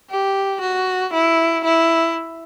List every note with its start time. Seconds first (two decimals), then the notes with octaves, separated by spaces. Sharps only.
0.11 G4
0.61 F#4
1.13 E4
1.65 E4